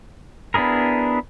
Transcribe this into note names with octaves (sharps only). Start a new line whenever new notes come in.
B3 D4 E4 G#4 A#4